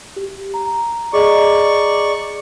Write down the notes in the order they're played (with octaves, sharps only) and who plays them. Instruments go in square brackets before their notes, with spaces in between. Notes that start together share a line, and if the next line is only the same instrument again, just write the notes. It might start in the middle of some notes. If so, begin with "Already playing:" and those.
[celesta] G4
A#5
[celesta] G#4 D#5 A#5 [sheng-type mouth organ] D5 C#6